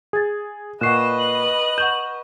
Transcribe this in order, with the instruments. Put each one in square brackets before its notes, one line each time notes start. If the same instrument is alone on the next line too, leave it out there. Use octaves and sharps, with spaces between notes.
[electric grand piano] G#4 [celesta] G#6 A6
[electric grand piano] A#2 C7 [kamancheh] B4 D#5 [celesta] F#5 C#6 F#6 [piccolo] E7
[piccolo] F#7
[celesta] F#5 C#6 E7 [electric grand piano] G6